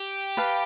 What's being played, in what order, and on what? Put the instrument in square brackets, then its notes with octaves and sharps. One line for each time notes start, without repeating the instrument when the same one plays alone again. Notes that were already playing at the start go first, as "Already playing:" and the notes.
Already playing: [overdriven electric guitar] G4
[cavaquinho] B4 F5 A5